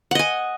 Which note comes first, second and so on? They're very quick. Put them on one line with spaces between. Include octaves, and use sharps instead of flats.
F#5 D#5 G#5